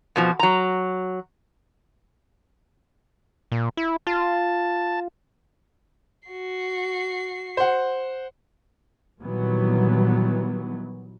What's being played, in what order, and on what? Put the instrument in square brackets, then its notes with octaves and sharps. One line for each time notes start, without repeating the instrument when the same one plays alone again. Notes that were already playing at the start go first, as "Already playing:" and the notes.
[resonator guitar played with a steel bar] F2 B2 F3
F#3 A#5
[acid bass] A#2
E4
[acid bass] F4 [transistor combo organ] A5
[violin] F#4 C7
[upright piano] C5 F#5
[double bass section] A#2 D#3 E3 F#3 G3 B3